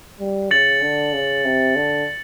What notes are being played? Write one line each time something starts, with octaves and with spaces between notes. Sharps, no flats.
G3
C#3 A6 C#7 F#7
D3
C#3
C3
D3